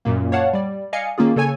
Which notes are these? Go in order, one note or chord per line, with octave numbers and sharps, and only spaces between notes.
F#2 A#2 A#3
C#5 D5 F5 F#5 A5
G3 D5
D5 D#5 F5 G#5 C#7
D#3 A#3 C#4 F4 G#4
C#3 A4 C#5 G#5 G#6